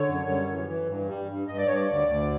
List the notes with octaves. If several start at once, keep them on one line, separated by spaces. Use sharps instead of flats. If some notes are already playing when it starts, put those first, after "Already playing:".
Already playing: D3 C#5
F#2
G3
E3
E3
G2
G3
G2
G2 D#5
D5
G2 C#5
D5
D2
D2